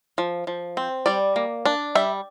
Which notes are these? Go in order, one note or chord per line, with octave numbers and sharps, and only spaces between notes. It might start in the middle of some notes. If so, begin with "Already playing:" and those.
F3
F3
C4
G3 D5
A#3
D4
G3 E5